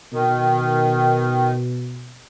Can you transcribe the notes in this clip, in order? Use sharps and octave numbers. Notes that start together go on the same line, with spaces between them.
B2 D#3